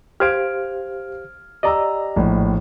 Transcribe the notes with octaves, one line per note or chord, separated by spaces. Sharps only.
G4 C5 F5 F6 G#6 D7
G4 D5 D#5 A#5 E6
A#1 A2